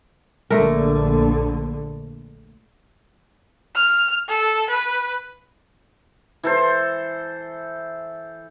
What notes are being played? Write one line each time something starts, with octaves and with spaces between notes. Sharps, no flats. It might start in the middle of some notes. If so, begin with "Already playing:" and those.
A#1 D3 A3 A#4
F6
A4
B4
E3 A4 C5